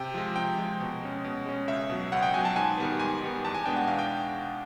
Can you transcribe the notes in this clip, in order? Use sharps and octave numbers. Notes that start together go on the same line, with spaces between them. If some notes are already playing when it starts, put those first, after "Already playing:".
Already playing: C3 G5
F3 G#3
C3 G5
F3 G#3
B2
G#3 C#4
B2
G#3 C#4
C#2 E5
B2 F#3
C#2 F#5
G5
B2 F#3 G#5
A5
G#2 G#5
D#3 G3 B3
G#2 G#5
D#3 G3 B3
E2 A5
G#5
B2 G#3 B3 D4 G5
F#5
E2 F5
G5